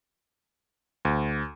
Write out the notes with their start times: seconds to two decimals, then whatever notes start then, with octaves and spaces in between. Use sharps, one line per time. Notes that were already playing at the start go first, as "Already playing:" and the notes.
1.05 D2